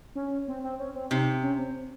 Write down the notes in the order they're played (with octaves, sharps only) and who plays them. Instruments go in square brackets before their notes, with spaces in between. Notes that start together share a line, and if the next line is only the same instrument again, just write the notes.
[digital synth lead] C#4
C4
C4
C#4
C4
[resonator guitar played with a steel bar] C3 [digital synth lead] D#4
[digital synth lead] C#4
C4